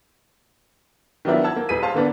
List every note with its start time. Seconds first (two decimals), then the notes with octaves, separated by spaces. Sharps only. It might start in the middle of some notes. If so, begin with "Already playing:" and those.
1.25 D#3 F3 F#3 B3 D4 E4
1.44 F#5 A5 E6 G#6
1.56 A#3
1.69 D#1 G#4 B4 B6 D#7
1.82 C5 F5 A5 C6
1.94 D3 A#3 B3 D4